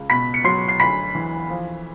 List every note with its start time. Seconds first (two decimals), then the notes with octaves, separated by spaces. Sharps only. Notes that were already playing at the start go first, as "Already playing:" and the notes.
Already playing: C#2
0.10 B2 B5 B6
0.34 C#7
0.44 F#3 C6 C7
0.68 C7
0.80 D2 B5 B6
1.15 E3
1.49 F3